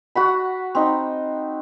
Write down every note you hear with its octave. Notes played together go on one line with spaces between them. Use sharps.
F#4 F#5 B5
C4 D#4